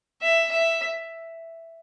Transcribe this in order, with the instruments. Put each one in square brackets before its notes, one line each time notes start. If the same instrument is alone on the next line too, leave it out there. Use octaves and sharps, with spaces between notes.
[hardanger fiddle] E5
E5